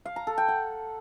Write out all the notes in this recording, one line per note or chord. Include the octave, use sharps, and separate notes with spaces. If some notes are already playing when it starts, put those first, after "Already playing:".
F5
A#5
A4
G5
F#5